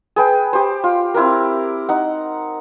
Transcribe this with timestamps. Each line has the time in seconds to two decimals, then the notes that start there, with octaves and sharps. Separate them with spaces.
0.16 G#4 B4 G5
0.53 G4 C5
0.84 F4
1.14 C4 E4 G4 A#4
1.89 D#4 F#5